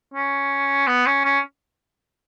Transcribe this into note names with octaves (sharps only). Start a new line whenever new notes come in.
C#4
B3
C#4
C#4